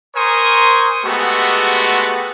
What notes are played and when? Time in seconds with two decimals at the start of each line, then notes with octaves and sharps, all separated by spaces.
0.16 A#4 C5 G#5 C#6 D#6
1.05 G#3 A3 B3 F#4 G4